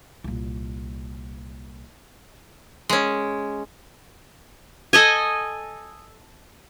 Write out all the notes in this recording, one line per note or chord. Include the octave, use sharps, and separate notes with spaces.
C2 A#2
G#3 C#4
A4 D#5 G#5